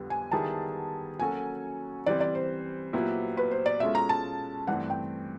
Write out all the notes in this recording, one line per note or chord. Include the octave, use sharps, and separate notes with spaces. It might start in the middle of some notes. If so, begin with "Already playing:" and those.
Already playing: F2 D3 G3 B3
G#5
D#3 G3 B3 E4 G#4 A5
F#3 A#3 C#4 F#4 A4 G#5
E3 G3 C4 D5
D5
C5
A#2 F#3 B3 E4 G4
B4
C5
D5
B2 G#3 C#4 F4 A4 E5
A#5
A5
G2 E3 A3 C4 F#5
G5